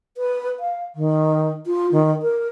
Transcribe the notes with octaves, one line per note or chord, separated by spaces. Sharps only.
B4
F5
D#3
F4
D#3
A#4